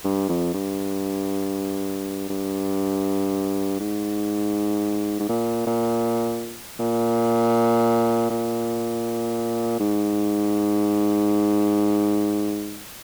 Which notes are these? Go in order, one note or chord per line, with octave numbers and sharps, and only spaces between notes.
G2
F2
G2
G2
G#2
G#2
A#2
A#2
A#2
A#2
G#2